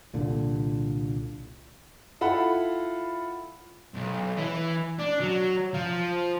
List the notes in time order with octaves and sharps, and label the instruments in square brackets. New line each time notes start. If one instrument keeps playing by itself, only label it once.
[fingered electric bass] C2 A#2 D3
[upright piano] E4 F4 A4 F#5 B5
[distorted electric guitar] B1
E3
D4
F#3
F3